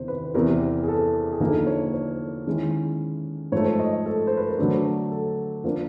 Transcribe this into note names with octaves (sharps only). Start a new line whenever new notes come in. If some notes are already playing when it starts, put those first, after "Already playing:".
Already playing: E2 C3 D#3 C5
B4
E2 C3 E3 A#4
G#4
A4
G#4
D3 F3 A#3 D#4 A4
C#5
C#5
D#3 G#3 C#4 E4
G#2 F3 A3 C#5
D#5
A4
C5
B4
A#4
D3 F#3 A3 D4 A4
A4
F3 A#3 D4 A#4